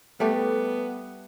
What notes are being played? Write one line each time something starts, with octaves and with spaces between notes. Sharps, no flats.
G3 A3 B3 D5